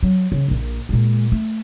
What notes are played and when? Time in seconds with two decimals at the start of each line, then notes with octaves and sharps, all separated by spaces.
0.03 F#3
0.32 C#3
0.48 A#1 A#2
0.89 A#2 G#3
1.32 A3